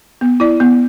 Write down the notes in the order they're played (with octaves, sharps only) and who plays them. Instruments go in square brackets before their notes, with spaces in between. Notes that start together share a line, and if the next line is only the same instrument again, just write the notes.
[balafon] B3
E4 D5
B3